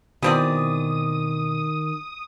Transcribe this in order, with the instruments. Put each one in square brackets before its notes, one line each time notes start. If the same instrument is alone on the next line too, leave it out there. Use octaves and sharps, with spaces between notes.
[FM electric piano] B2 [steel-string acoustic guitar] D#3 [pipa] E3 C4 D5 [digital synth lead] D#6